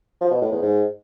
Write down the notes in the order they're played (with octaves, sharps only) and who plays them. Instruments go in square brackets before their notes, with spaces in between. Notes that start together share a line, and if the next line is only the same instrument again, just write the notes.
[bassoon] F3
B2
A2
E2
G#2